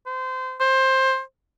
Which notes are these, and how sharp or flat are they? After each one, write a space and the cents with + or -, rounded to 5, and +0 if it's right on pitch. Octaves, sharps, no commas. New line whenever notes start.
C5 -25
C5 +15